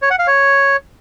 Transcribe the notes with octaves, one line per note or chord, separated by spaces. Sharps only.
C#5
F#5
F5
C#5